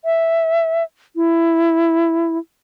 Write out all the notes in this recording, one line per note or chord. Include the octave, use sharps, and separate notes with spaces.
E5
E4